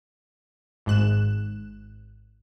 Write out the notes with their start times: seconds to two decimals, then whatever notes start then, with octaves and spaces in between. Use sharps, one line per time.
0.86 G#1 G#2 F#6 E7